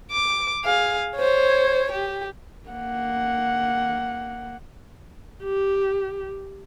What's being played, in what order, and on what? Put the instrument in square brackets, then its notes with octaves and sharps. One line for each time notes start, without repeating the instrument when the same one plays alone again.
[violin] D6
G#4 F5
C5 C#5
G4
[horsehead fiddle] A#3 F#5
[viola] G4